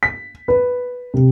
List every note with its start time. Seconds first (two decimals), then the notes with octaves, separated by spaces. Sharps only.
0.03 B6
0.48 B4
1.14 C3